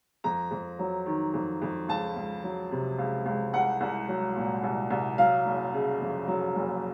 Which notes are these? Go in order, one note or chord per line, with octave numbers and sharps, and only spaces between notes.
F2 A#5
F2
F#3
D#3
F2
F2
C#2 A5
C#2
F#3
C3
C#2
C#2
C2 F#5
C2
F#3
A#2
C2
C2
F#3 F5
F#1
C#3
F2
F#3
F#1